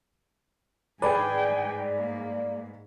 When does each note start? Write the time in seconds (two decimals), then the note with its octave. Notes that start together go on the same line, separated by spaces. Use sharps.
1.02 G#2 G#4 B4 D5 G5 G#5
1.99 A#3